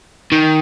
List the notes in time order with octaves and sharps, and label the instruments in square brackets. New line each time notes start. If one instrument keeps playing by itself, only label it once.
[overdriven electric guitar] D#3